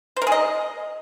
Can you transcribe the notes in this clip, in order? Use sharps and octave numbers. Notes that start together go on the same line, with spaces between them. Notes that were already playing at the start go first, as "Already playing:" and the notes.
C5
A#4
G#4
D#5